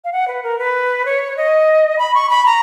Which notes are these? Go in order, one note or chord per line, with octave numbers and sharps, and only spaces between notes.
F5
F#5
B4
A#4
B4
C#5
D#5
B5
C#6
B5
A#5